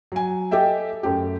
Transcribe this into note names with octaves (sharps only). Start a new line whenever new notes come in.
F#3 G#5
G4 A4 D#5 E5 G5
F#2 A3 G4